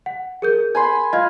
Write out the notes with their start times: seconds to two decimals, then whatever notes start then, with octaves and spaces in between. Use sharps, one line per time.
0.06 F#5
0.42 G#4 A#4 G6
0.75 G#5 B5 C6
1.13 F4 D#5 F5 G#6